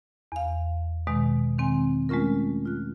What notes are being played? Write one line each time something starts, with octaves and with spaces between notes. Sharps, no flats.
E2 F5
B2 D#3 G#3
D#3 C4 G#5
G#3 A3 C#4 F4 A#4
F4 F#6